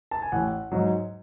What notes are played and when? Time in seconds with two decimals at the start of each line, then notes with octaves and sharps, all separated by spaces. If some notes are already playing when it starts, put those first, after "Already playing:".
0.11 A5
0.22 G#5
0.32 A1 F#5
0.72 G#2 F#3